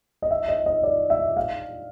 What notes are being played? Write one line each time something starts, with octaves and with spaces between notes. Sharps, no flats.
D#5
E5
D#5
D#5
D5
E5
F5